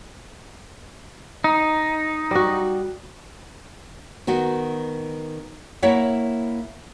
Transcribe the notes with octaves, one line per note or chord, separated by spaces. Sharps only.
D#4
G3 F#4
D#3 B3 F#4
A#3 E4 C#5 E5 F#5